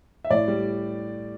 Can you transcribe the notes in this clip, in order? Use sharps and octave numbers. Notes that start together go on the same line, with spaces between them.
E5
A2 D5
G3